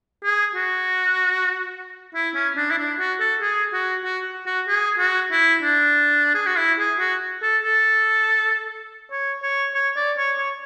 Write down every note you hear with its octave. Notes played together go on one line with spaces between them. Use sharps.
G#4
F#4
E4
C#4
D4
E4
D4
F#4
A4
G#4
F#4
F#4
F#4
G#4
F#4
E4
D4
G#4
F#4
E4
G#4
F#4
A4
A4
C#5
C#5
C#5
D5
C#5
C#5